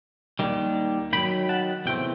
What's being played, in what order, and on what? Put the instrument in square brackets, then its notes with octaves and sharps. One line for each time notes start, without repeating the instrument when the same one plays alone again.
[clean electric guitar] D#2 D#3 G3
G2 D#3 F#3 G5 B5
F#5 A5
E2 C3 A3 C4 G5